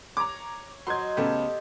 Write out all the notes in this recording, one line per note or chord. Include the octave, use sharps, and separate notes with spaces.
C#5 A#5 D6
F#3 C5 D#5 C6 G#6
C#3 A3 B3 G4 A4